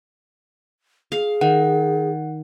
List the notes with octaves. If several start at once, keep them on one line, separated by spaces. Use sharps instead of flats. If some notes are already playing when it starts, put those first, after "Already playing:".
G#4 F5
D#3 F#5